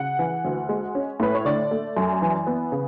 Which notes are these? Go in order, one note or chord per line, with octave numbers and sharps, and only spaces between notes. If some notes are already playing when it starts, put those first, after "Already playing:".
Already playing: C#3 F#5
E3
D2
G#3
C#4
A2 B4
C#5
D3 D5
A3
F#2
E3
B3
C#3